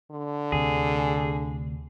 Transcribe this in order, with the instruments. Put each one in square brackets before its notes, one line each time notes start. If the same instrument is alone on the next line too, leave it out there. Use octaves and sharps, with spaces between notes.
[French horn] D3
[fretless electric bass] D2 C3 [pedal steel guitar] G#4